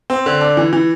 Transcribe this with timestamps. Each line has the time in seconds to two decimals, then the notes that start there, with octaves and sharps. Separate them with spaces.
0.10 C4
0.26 D3
0.41 D4
0.57 E3
0.73 E3